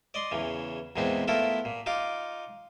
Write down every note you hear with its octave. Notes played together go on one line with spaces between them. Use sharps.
D5 D#5 C6
E2 C#3 E3
E2 A#2 G#3 B3 C4
A3 B3 E4 F4 A4 A#4
A#2
D#4 F4 F5 D6